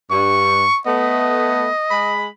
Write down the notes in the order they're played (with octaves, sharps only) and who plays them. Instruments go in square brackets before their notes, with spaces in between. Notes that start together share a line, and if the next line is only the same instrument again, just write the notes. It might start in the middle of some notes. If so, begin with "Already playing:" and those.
[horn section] G2 [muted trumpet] C#6
[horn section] A3 B3 [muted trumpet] D#5
[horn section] G#3 B5